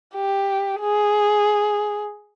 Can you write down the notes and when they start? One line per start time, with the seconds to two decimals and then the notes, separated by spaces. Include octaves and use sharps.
0.15 G4
0.81 G#4